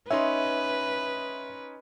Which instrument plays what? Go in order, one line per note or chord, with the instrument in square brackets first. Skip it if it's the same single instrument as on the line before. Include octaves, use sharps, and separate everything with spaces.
[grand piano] C#4 D#4 C6 [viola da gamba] B4 [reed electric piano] E5